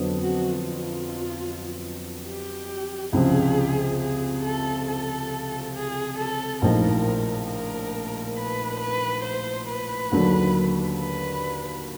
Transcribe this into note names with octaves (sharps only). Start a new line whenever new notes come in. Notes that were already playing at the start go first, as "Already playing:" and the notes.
Already playing: F2 D3 F#3 B3
F#4
F4
G4
C#2 C3 F3 G#4
G#4
A4
A4
G#4
A4
A#1 A2 F3 A#3 D#4 A#4
A#4
B4
B4
C5
B4
D#2 D3 F#3 A#3 D4
B4